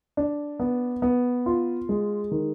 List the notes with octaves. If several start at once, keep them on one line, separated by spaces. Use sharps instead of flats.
D4
B3
B3
F4
G#3
D#3